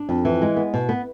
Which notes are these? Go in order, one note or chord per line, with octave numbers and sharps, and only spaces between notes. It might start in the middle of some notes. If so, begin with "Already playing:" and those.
Already playing: D4
F2
E3
G#3
B3
B2
B3